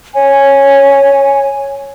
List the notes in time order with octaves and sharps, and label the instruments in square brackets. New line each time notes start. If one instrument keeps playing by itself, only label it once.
[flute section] C#5 G#5